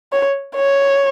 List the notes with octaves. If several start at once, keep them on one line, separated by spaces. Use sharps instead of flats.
C#5
C#5